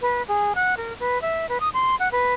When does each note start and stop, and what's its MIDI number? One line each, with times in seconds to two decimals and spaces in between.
0.01 0.22 71
0.28 0.53 68
0.55 0.74 78
0.77 0.93 70
1.00 1.20 71
1.22 1.46 76
1.49 1.58 71
1.60 1.69 87
1.74 1.95 84
1.99 2.08 78
2.12 2.34 71